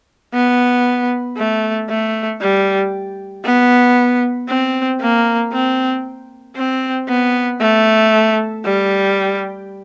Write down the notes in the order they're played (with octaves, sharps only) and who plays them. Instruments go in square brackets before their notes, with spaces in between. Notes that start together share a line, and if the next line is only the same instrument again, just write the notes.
[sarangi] B3
A3
A3
G3
B3
C4
A#3
C4
C4
B3
A3
G3